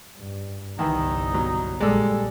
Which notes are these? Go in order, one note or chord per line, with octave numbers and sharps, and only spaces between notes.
G2
G1 C2 D#3 E3 D#4
B2 F#3
A#1 G3 G#3 A4 D5